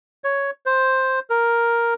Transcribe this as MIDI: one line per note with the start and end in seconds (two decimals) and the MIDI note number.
0.24 0.51 73
0.66 1.20 72
1.30 1.94 70